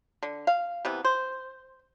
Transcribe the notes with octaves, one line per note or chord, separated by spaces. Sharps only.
D3
F5
C3 E3 B3
C5